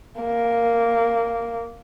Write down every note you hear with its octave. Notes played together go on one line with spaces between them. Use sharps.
A#3